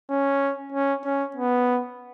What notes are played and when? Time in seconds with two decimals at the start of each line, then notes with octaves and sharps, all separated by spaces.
0.10 C#4
0.72 C#4
1.05 C#4
1.36 B3